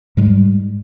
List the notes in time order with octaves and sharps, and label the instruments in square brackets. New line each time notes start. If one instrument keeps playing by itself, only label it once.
[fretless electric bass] G#2 G3 G#3